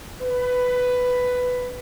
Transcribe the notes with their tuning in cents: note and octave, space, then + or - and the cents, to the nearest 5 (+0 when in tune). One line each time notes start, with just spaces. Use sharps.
B4 +10